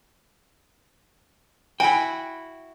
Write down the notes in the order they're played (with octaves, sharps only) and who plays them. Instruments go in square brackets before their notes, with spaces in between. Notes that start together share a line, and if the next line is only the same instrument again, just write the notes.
[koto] E4 F#4 [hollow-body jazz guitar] G5 [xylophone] G#5 B5